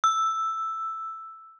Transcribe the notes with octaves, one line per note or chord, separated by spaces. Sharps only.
E6